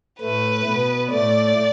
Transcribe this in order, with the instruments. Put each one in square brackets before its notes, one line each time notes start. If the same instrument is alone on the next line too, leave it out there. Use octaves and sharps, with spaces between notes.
[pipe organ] A2 A3 [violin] B4
[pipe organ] B2 B3
[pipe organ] A2 A3 [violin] D5